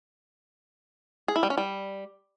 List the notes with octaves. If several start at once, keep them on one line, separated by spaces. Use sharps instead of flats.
G#4
E4
G3
C#4
G3